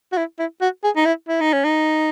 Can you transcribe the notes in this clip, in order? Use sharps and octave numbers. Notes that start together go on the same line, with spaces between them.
F#4
E4
E4
F#4
G#4
D#4
E4
E4
D#4
C#4
D#4